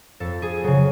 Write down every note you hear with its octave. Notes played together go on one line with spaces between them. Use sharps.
F2 A4
G#4
C#3 F#3 G#4